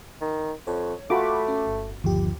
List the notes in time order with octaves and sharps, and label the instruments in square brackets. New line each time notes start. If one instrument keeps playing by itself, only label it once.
[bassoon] D#3
[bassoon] F2 [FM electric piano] C#5
[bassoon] A3 [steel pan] F4 F#4 [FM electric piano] B5 D6
[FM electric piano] C#4
G1
[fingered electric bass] G1 F3 [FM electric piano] D#2 G4